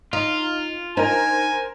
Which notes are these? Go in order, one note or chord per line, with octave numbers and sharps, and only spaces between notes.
D#4 F4
D#4 A#4 C5 G#5